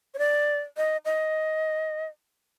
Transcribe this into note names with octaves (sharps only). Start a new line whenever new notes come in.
C#5
D5
D#5
D#5